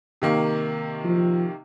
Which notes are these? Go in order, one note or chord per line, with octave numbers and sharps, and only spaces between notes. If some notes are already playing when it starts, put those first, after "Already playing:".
C3 D#3 A#3
F3